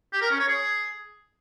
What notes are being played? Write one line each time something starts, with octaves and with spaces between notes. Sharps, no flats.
G4
A#4
C#4
C#5
G#4